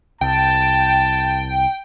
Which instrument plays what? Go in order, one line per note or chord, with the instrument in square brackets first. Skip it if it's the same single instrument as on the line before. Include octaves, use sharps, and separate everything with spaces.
[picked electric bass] C2 [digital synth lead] G5 [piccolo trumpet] A5